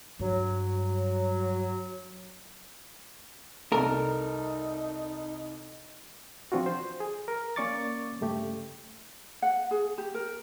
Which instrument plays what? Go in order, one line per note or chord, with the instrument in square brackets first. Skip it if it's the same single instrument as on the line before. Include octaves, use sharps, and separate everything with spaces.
[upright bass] G2 [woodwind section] F#3
[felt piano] C2 A4 [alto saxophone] D#4 [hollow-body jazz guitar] A#4
[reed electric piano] F3 C4 D4 F4 F#4
C5
G#4
A#4
A#3 C#4 D5 C#6 D6 A6
G2 C#3 A3 G4
[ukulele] F#5
G#4
G4
A#4